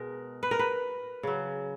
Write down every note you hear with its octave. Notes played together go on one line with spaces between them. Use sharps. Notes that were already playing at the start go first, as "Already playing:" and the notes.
Already playing: B2 G#3 A#4
B4
A#4
B4
C#3 F#3